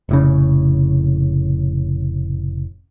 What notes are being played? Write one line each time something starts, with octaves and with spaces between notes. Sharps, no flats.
F1 A2 C#3